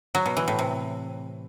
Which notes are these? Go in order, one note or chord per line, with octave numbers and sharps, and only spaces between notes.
F#3
B2
E3
A2
C3